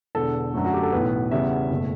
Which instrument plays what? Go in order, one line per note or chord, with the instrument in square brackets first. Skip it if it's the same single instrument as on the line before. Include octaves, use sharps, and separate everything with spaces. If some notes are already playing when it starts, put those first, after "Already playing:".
[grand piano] E1 E2 D3 A4
F#2 D3 F#3 A3
F#4
G4
A4
B1 A2 E3 B3 B4
E2 C#3 G3 B3 E5
F#1 B2 A3